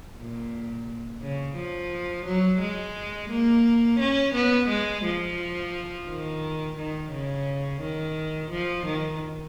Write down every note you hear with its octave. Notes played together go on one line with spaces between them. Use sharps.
A#2
C#3
F3
F#3
G#3
A#3
C#4
B3
G#3
F3
D#3
D#3
C#3
D#3
F3
D#3